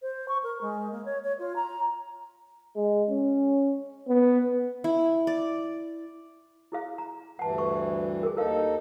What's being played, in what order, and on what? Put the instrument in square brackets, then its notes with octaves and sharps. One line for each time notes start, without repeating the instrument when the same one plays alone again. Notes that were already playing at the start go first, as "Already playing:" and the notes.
[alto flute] C5
C#6
A#4
G#3
A#3
C#5
C#5
F4
A#5
[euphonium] G#3
C#4
B3
[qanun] E4
D5
[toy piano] E4 G#4 F5
A#5
[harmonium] D2 G2 E3 [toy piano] F#5 A5
[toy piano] C#6
G#4 A#4
[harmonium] D#2 D#4 A4 [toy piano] E4 A#4 F5